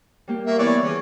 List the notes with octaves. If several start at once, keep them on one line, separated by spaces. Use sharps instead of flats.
G3 A#3 G4
A#3 A#4 E5 C#6
E3 B3 C#5 D5
E3 C#4 G#4